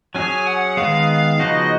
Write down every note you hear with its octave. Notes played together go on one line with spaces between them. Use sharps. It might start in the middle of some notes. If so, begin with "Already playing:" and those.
F#3 C#4 G#4 C#5 G#5
F#5
D#3 G#3 B3 F5
C#3 F3 B3 D#4 F#4 D#5